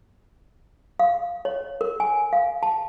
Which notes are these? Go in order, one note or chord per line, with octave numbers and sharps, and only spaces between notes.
F5
C#5
A#4
G#5
F5
A5